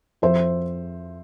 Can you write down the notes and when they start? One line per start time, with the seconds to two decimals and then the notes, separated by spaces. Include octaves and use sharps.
0.22 F2 C5 E5